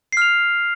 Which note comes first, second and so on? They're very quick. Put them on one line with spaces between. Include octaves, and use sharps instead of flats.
C7 F6 F7